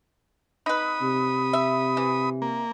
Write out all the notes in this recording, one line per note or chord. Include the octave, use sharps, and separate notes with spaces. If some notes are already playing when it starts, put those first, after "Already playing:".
D#4 B4 B5 D#6
C3
E5
E3
A#3